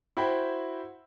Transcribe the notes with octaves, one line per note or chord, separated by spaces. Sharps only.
E4 F#4 C5 G5 B5